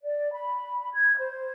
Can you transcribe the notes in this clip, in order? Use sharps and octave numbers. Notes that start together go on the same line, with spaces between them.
D5
B5
G#6
C5